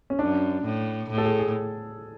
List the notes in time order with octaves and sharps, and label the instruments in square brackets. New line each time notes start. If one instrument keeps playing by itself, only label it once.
[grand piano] C#4
[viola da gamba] F#2 [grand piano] D4
[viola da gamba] A2
A2
[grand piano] A4
G#4
G#4